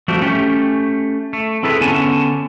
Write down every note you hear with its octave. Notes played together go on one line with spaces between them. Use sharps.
F3 G3 A3 C4 D4 F#4
A3 C#4 G4
A3
C4 E4 G#4 A4 B4
D3 B3 C#4 G#5 A5